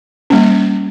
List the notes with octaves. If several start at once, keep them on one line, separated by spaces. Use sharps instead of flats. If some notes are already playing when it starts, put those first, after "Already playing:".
G3 A#3 C#4